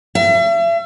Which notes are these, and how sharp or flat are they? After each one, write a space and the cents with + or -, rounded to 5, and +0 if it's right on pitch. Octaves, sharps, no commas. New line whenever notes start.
E5 +40